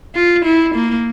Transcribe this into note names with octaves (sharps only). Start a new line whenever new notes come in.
F4
E4
A#3